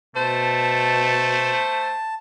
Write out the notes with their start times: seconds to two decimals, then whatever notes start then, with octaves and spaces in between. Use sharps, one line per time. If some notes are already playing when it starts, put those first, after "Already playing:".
0.16 B2 A3 C5 A5